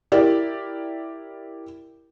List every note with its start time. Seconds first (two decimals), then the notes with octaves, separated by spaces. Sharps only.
0.12 E4 G4 A#4 D5